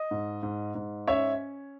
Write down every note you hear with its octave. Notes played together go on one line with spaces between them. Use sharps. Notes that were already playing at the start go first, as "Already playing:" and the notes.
Already playing: D#5
G#2
G#2
G#2
C#4 C#5 E5